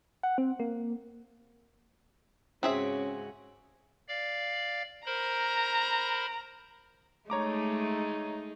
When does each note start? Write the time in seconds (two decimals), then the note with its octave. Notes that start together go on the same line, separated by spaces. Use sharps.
0.23 F#5
0.38 C4
0.60 A#3
2.63 G#2 C#3 C4 C#4 F#4 G#4 E5
4.08 D5 F5
5.06 A#4 C5 A#5 B5
7.30 G#3 A3 D#4 C#5 A#5 D6